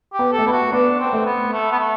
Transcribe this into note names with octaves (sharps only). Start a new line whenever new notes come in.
G4
B3
A4
A3
B3 E4
F#4
B3 D4
C4
A3
B3
A3
B3
A3